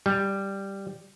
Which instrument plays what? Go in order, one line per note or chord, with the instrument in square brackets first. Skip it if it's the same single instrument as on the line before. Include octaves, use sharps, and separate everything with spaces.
[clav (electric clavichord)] G3